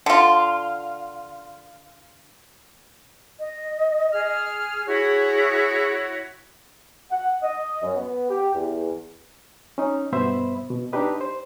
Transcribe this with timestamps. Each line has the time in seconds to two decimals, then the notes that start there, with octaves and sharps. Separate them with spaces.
0.06 D3 F4
3.40 D#5
4.13 G#4 F6
4.85 E4 F#4 G#4 C#5
7.11 F#5
7.42 D#5
7.83 F#2
7.95 B3
8.29 G4
8.54 E2
9.78 C#4 D#4
10.12 G2 B2 B3 C5 E5 B5
10.70 B2
10.93 D4 D#4 G4 B4 D#5
11.21 C5